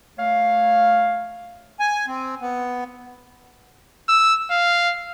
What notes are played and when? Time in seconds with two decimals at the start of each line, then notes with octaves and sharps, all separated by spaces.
0.19 A3 C#5 F5
1.80 G#5
2.07 C4
2.41 B3
4.08 E6
4.50 F5